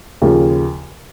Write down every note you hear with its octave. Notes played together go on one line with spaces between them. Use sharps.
D#2 C#3 F3